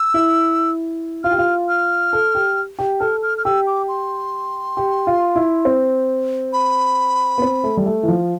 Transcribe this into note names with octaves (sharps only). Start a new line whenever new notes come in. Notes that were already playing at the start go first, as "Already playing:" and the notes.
Already playing: E6
E4
F4 F6
G4
F4
F6
A4
G4
G4
A4 F6
F6
F6
G4 E6
D6
C6
G4
F4
E4
C4
B5
B3
C4
A3
G3
A3
E3
F3